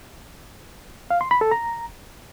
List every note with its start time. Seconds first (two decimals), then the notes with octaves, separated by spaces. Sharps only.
1.11 F5
1.21 C6
1.31 B5
1.41 A4
1.52 A#5